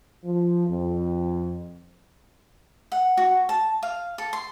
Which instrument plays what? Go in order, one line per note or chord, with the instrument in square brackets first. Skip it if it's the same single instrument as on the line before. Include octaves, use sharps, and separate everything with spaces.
[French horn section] F3
F2
[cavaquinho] F#5
F#4
A5
F5
A4
C6